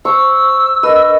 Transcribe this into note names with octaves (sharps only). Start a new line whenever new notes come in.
C5 C#6 E6
D4 A#4 B4 D#5